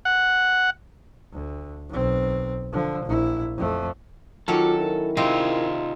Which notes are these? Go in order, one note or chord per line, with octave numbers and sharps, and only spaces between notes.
F#5
D2
B1 C4
D3 F3
A#1 E4
F2 A3
D#3 F#3 C#4 F4 F#4 A4 D6
E4 A#4
C3 G#3 C4 D#4 F4